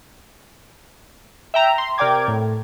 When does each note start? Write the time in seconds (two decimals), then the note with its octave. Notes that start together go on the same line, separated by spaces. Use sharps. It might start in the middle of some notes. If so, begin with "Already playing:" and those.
1.54 E5 G5 A#5
1.78 C6
1.98 C3 A#4 D5 G5 D6 G#6
2.28 A2